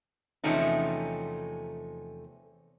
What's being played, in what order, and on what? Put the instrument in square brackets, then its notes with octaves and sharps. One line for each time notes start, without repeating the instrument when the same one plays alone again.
[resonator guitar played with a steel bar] E2 C3 F3 A3 C#4 D#4